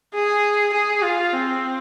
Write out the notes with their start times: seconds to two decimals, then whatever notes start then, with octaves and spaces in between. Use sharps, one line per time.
0.14 G#4
0.74 G#4
1.02 F4
1.33 C4